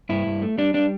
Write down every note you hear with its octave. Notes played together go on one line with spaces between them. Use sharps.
G2 E4
G2
A3
G3 D4
G3 D4